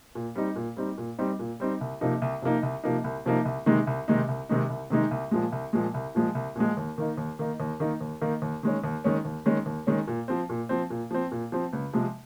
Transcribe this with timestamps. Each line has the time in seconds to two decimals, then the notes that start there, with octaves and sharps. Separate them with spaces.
0.15 A#2
0.35 G3 C4 D#4
0.56 A#2
0.77 G3 C4 D#4
0.98 A#2
1.18 G3 C4 D#4
1.39 A#2
1.60 G3 C4 D#4
1.81 C2
2.01 C3 F3 A#3 D#4
2.22 C2
2.42 C3 F3 A#3 D#4
2.63 C2
2.84 C3 F3 A#3 D#4
3.04 C2
3.26 C3 F3 A#3 D#4
3.45 C2
3.66 C3 D#3 G#3 D#4
3.87 C2
4.08 C3 D#3 G#3 D#4
4.28 C2
4.49 C3 D#3 G#3 D#4
4.70 C2
4.90 C3 D#3 G#3 D#4
5.11 C2
5.31 A#2 F3 G#3
5.52 C2
5.73 A#2 F3 G#3
5.94 C2
6.15 A#2 F3 G#3
6.35 C2
6.55 A#2 F3 G#3
6.77 D#2
6.98 D#3 A#3 D#4
7.17 D#2
7.39 D#3 A#3 D#4
7.60 D#2
7.80 D#3 A#3 D#4
8.01 D#2
8.21 D#3 A#3 D#4
8.42 D#2
8.63 D#3 G#3 C#4
8.84 D#2
9.04 D#3 G#3 C#4
9.25 D#2
9.46 D#3 G#3 C#4
9.66 D#2
9.87 D#3 G#3 C#4
10.07 A#2
10.28 F3 C4
10.49 A#2
10.69 F3 C4
10.90 A#2
11.11 F3 C4
11.31 A#2
11.52 F3 C4
11.73 C#2
11.93 C3 F3 G#3